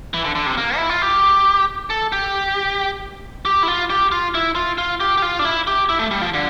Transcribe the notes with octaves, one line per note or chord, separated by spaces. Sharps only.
E3
D3
D3
C3
A#3
E4
F4
G4
A4
G4
G4
E4
F4
G4
F4
E4
F4
F4
G4
G4
F4
D4
E4
G4
E4
A3
G3
F3
D3